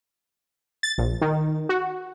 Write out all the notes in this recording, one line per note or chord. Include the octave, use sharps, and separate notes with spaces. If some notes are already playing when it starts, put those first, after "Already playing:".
A6
A#1
D#3
F#4